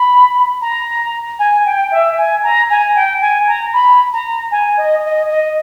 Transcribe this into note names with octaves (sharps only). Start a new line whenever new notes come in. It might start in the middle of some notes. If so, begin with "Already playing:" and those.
Already playing: B5
A#5
G#5
G5
E5
G#5
A#5
G#5
G5
G#5
A#5
B5
A#5
G#5
D#5
D#5
D#5